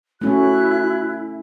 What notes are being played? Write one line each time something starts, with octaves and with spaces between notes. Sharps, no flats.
A3 C#4 E4 F#4 F#6